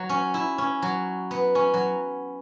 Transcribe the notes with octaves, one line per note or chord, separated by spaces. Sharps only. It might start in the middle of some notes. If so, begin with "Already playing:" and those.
Already playing: F#3
C#4
E4
C#4
F#3
B3
C#4
F#3